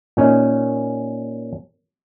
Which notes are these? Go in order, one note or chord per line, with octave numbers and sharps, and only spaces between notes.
A#2 C#4 D#4